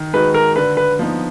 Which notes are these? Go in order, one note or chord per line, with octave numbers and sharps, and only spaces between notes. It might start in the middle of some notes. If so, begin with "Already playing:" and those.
Already playing: D#3
G#3 D#4 F#4 B4
A#4
D3 B4
B4
F3 B3 D#4